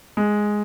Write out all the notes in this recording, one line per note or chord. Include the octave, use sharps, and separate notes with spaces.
G#3